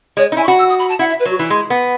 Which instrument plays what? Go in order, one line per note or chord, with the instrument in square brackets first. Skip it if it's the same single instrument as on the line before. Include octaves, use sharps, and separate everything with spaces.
[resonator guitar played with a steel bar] G#3 [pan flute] C#5
[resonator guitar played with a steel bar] D#4
[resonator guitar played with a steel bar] E4 [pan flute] G#5
[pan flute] C#6
[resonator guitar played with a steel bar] F#4 [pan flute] B5
[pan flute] E6
D#6
B5
A5
[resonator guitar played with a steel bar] E4 [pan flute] F#5
[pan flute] E5
B4
[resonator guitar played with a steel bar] F#3 [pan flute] F#4
[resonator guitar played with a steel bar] E3 [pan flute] E4
[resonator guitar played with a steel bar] G#3
B3